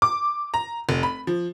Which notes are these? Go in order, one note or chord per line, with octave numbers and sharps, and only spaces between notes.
D6
A#5
F1
B5
F3